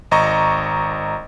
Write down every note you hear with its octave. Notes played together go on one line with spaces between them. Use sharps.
G#1 D#5 A#5 C#6